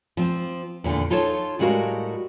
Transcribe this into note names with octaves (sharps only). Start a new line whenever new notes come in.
F3 C4
E2 A#2 D3
D#4 F4 A4 C#5 A5
A2 G3 G#3 F#4 A#4 F5